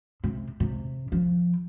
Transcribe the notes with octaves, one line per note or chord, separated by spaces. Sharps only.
C3
C3
F3